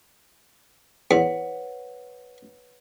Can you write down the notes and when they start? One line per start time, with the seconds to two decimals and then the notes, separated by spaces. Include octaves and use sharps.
1.11 E2 B4 C#5 F#5